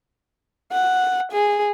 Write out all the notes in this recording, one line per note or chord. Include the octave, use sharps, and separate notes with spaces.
F#5
G#4